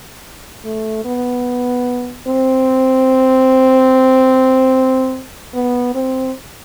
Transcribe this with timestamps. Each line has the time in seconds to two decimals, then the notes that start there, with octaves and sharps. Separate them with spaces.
0.65 A3
1.05 B3
2.27 C4
5.54 B3
5.95 C4